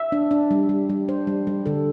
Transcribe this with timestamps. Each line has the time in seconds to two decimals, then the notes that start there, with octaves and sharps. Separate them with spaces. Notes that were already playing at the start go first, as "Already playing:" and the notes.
Already playing: E5
0.12 D4
0.31 D4
0.51 G3
0.69 G3
0.90 G3
1.08 D4 C5
1.27 G3
1.47 G3
1.66 D3 A4